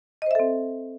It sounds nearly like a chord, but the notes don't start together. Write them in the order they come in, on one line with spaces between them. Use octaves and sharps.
D#5 C5 E5 A4 C4